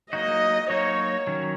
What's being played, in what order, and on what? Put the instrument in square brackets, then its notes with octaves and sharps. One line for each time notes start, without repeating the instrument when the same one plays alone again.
[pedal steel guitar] F#3 A#3 D#4 F#4 [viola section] D#5
[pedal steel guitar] F#3 A#3 D#4 F#4 [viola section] C#5
[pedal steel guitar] D#3 F#3 C#4